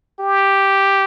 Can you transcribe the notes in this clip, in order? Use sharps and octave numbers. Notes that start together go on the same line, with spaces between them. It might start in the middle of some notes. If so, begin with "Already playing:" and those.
G4